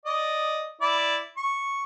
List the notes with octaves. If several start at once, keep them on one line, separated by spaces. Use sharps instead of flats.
D5 D#5
E4 D5
C#6